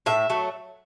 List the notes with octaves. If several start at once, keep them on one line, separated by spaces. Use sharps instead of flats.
A2 E5
F#3 A3